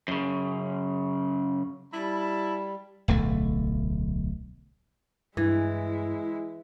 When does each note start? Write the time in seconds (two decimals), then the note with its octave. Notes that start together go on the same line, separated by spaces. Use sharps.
0.08 F#2 C#3
1.92 G3 E4 A5 B5
3.08 D1 B1 A3
5.37 G2 E3 G#3 E4